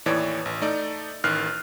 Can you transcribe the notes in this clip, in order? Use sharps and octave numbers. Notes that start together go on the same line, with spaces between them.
D#2 A2 E3 C#5 D5
A1
A3 D#4 D5
A1 D#3 F6 F#6 C7